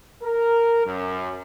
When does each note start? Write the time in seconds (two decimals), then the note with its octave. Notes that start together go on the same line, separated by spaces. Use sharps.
0.23 A#4
0.86 F#2